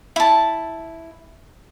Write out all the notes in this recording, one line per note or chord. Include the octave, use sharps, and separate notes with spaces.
E4 A5